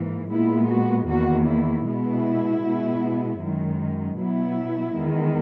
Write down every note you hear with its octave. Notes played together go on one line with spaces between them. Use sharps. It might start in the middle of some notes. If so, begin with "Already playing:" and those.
Already playing: G#2 E3 A#3
A#2 G#3 B3 E4
F#4
E2 D#3 A#3 F#4
E4
B2 G#3 B3 E4
B2 G#3 B3
F#2 D#3 G#3
B2 F#3 B3 E4
E2 D#3 G#3 B3